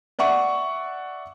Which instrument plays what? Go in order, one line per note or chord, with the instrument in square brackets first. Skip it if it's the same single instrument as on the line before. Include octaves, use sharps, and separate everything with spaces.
[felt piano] D5 E5 F#5 C#6